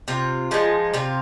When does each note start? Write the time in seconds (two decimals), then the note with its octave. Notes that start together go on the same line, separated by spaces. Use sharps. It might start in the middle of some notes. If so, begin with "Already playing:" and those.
0.08 C3 F4
0.51 F3 G#3 D#4
0.93 C3 F4